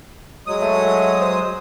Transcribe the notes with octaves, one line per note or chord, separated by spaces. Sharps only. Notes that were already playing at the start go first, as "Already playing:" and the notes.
F#3 G#3 D#6
A3
C5